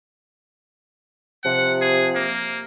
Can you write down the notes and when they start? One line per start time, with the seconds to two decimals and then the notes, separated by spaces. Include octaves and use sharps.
1.44 C3 F3 F#5
1.81 G#4
2.15 A#3